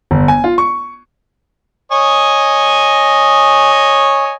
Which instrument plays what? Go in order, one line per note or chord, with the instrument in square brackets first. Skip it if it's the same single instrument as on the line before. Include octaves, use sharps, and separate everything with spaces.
[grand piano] G1
G#5
F4
C#6
[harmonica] C#5 D#5 G#5